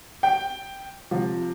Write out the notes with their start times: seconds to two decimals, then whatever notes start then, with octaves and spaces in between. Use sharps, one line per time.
0.23 G5
1.11 C3 F3